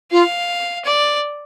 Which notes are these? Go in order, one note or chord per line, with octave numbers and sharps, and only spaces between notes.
F4 F5
D5